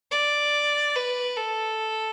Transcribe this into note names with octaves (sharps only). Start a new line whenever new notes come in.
D5
B4
A4